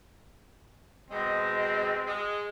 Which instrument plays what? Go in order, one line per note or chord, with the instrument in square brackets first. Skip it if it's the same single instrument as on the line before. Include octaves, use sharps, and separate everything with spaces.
[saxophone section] B2 G#3 [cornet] C4 [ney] D#5
[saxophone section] G#3